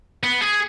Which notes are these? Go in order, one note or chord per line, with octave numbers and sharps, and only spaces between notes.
B3
G#4